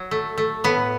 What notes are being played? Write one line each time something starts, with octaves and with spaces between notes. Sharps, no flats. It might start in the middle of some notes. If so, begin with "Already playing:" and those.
Already playing: F#3
A3
A3
A2 B3